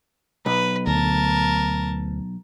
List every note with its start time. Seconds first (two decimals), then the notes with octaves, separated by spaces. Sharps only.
0.46 B1 B4
0.87 D2 A#4 A5